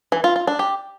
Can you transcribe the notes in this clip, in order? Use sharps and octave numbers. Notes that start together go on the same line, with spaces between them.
E3
F4
F4
D4
G4